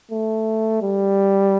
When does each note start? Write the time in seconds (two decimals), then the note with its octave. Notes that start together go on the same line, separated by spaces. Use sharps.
0.11 A3
0.82 G3